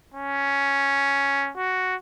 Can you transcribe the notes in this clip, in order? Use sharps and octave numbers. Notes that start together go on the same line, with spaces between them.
C#4
F#4